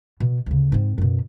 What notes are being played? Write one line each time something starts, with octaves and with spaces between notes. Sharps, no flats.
B2
D2 C#3
G#2 C4
F#2 B2